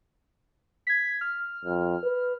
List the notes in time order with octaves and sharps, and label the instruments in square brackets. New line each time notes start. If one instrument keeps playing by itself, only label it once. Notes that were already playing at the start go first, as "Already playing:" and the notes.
[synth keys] G#6 B6
F6
[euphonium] F2
B4